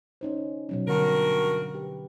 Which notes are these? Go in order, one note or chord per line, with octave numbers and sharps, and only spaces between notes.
C#4 D#4 C5
B2 F#3 C#4
G2 D3 F#4 A#4
G4 B4